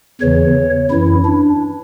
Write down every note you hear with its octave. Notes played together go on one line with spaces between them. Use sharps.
E2 C#3 E3 C#5
F#2 E3 E4
D4